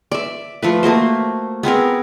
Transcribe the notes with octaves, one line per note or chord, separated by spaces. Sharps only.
D5 E5
F3 A3 B4
A3 A#3 F#4 C5
B3 C4 G#4 A#4